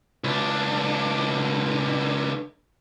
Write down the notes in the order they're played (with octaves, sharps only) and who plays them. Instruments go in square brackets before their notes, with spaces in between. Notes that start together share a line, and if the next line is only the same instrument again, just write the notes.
[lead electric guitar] C#2 D4